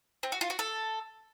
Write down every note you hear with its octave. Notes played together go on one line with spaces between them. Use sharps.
C4
F#4
F4
F#4
A4